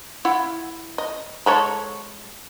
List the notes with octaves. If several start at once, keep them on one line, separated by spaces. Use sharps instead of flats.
E4 F4 F#5
D#5
G#3 A4 C#5